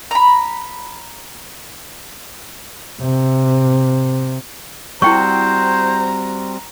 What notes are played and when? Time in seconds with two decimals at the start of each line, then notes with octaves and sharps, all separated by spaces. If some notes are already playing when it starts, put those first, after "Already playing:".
0.11 A#5 B5
3.01 C3
5.02 G3 C4 E4 F#4 C5 G5 A#5 C#6